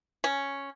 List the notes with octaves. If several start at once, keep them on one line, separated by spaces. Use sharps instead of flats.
C#4